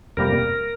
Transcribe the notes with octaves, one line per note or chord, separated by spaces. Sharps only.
F2 C3 G3 A#3 A#4